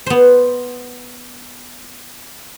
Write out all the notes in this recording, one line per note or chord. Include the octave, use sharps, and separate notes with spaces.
B3 C5